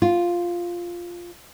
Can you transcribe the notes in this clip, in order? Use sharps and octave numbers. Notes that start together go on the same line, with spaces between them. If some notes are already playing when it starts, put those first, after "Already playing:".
F4